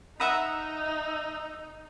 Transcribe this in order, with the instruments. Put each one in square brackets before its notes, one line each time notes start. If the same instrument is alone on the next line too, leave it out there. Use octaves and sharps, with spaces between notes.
[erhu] D#4 [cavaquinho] E5 F#5 B5 [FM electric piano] A#5 D#6 E6